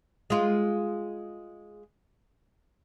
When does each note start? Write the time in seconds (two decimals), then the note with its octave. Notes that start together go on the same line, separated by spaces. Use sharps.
0.30 G#3 F4